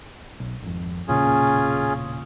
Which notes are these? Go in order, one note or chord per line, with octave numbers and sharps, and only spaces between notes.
B1
G#1 F2
E1 A#2 C#3 C#4 F4 G#4